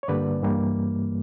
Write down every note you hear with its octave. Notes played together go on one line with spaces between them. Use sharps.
C#5
G2 D3 G3 A#3 B4 D5
G2 E3 G3 A#3